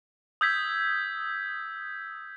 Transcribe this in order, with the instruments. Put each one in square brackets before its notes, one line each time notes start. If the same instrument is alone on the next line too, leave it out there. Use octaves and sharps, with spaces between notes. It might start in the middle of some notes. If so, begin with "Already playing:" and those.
[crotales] D#6 E6 G6 G#6 B6